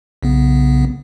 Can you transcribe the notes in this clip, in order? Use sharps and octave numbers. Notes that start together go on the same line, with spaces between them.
B1 C#3 B3